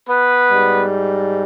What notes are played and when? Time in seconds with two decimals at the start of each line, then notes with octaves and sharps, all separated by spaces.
0.08 B3 B4
0.50 G#2 G3